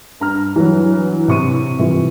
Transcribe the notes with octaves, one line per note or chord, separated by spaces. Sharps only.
G2 A#5 F6
E3 F#3
C3 C#6 D#7
C3 E3 F4